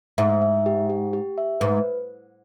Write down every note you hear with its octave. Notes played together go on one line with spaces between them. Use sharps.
G#2 E5
E5
G4
G4
G4
E5
G#2 B4